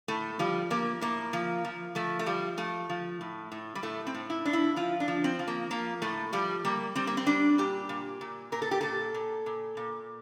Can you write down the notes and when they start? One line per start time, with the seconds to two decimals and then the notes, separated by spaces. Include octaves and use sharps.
0.08 A2 A3
0.39 F3 G3
0.70 F3 A#3
1.01 A2 A#3
1.33 F3
1.65 F3
1.95 F3 A3
2.19 A3
2.26 F3 G3
2.57 F3 A3
2.89 F3
3.21 A2
3.52 A2
3.75 G3
3.83 A2 A3
4.07 C4
4.14 A2
4.30 E4
4.45 A2 D4
4.53 E4
4.76 F3 F4
5.00 D4
5.08 F3
5.24 C4
5.39 F3
5.47 A#3
5.70 F3 A#3
6.02 A2 A3
6.33 F3 G3
6.65 G3 A#3
6.95 G3 C4
7.07 A#3
7.17 C4
7.27 G3 D4
7.58 A#2 G4
7.89 A#2
8.21 A#2
8.52 A#2 A#4
8.62 A4
8.71 G4
8.81 A#2 A4
9.14 A#2
9.46 A#2
9.77 A#2